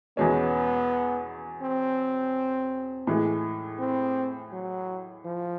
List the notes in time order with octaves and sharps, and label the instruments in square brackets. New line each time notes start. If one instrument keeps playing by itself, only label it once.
[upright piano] E2 B2 G#3 C#4 [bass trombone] B3
[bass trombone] C4
[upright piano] A2 E3 G#3
[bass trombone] C4
F#3
F3